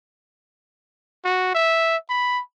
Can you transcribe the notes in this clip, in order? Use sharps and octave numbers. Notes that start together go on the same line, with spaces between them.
F#4
E5
B5